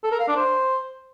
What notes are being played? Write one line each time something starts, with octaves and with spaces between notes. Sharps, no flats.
A4
A#4
F5
D4
C5